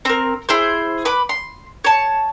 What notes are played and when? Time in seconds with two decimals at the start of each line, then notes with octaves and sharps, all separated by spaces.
0.05 C4 A#4
0.49 E4 G#4 C5
1.05 B4 B5 D6
1.29 C6
1.85 C#5 A5